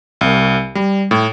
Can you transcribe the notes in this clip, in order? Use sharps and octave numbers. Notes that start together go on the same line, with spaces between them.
C2
G3
A2